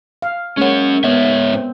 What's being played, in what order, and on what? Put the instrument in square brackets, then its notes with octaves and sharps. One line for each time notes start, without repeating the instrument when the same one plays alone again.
[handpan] F5
[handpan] G#3 A#3 C#5 [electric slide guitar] C#4 F#5
[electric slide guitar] G#2 C#5 E5 [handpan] B3
[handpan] C4